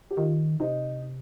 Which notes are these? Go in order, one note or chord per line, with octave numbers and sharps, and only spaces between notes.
G4
D#3 F4
C3 D#4